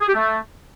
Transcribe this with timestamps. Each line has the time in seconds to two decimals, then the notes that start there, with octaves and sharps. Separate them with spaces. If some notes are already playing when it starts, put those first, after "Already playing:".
0.01 G#4
0.08 G4
0.15 A3